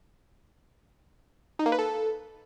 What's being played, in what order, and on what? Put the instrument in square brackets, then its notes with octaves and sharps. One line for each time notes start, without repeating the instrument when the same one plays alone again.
[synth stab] D#4
A#3
B4
A4